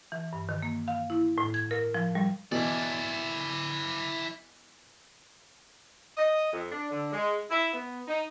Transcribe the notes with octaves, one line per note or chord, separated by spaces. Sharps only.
E3
G2
D#3
A#3
F5
E4
A2
G#6
A#4
F3
G3
B2 E3 E4 D5
D#5
F2
D4
D3
G#3
E4
B3
D#4